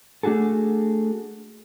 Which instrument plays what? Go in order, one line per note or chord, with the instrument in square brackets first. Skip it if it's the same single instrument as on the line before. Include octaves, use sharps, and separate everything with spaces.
[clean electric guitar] A3 D4 F#4 G#4 A4